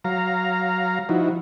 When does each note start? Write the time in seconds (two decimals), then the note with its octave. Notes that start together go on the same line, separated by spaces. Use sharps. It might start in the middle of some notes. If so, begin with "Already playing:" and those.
0.05 F#3 F5 A#5
1.09 F3 D#4 E4 F#4